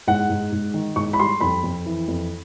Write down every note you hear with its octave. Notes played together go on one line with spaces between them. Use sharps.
G#2 F#5
G#2
G#2
D#3
G#2 C#6
B5
G3 C6
F2 B5
F2
E3
F2